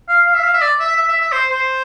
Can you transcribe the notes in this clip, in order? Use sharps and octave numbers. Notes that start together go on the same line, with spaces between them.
F5
F5
E5
F5
E5
D5
E5
E5
E5
E5
C5
C5